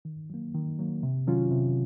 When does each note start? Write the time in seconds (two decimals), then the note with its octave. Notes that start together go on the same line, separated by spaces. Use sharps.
0.05 D#3
0.30 F#3 A#3
0.54 D#3
0.79 F#3 A#3
1.03 C3
1.27 D#3 F#3 C#4 F4
1.52 C3